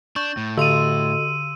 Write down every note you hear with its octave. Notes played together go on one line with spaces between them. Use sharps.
D4 C#6 G6
A2
D3 F#4 A4 D#5 C6 E6 D#7